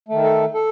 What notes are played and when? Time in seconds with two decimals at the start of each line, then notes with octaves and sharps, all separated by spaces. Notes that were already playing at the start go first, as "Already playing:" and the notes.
0.09 D#3 A3
0.23 A4
0.54 A4